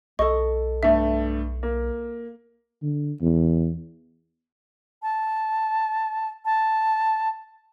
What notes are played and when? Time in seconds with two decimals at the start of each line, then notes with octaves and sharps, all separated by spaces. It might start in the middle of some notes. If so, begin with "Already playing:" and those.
0.19 B1 A4 D#5 C#6
0.83 G2 A3 E5
1.63 A#3
2.82 D3
3.21 E2
5.02 A5
6.45 A5